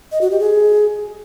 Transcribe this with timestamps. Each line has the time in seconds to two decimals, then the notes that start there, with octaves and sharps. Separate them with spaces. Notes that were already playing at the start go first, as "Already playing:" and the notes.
0.12 D#5
0.21 F#4
0.31 G4
0.40 G#4